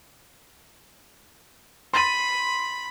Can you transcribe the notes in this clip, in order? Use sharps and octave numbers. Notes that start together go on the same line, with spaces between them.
B5 C6 A6 D#7